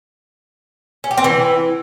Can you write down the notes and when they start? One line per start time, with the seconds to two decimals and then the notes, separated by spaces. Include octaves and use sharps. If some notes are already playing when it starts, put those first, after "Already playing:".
1.04 C#4
1.11 G4
1.18 C4
1.24 E3